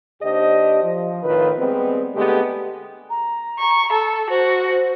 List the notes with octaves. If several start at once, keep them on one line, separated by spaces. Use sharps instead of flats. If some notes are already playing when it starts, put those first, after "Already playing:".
D#2 D4 G4 C5 D#5
F3
F2 A2 D#3 F4 B4
G3 G#3 B3 C4
D3 G#3 A3 B3 G4
A#5
C#6
A4
F#4 C5